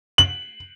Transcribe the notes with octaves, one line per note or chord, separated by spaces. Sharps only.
F#7